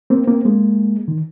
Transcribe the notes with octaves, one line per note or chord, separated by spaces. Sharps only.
A#3 C4
A#3 C4
G#3 A#3
D#3